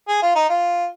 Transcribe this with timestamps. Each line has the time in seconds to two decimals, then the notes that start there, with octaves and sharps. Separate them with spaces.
0.08 G#4
0.22 F4
0.36 D#4
0.49 F4